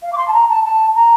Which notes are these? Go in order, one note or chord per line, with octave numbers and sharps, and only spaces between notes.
F5
D6
C6
A5
A#5
A5
A5
A#5